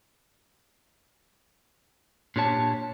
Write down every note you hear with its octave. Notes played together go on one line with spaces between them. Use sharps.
A#2 D4 G4 C#5 A5